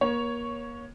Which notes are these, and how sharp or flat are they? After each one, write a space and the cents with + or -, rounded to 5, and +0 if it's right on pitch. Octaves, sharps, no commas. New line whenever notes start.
A#3 +35 C#5 +0